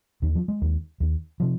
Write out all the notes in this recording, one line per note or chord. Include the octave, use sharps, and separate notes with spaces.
D#2 D#3
F3
G#3
D#2
D#2
C3 F3